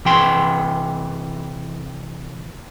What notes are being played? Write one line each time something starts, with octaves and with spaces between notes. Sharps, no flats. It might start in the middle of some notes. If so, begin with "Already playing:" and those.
C3 E3 G5 C6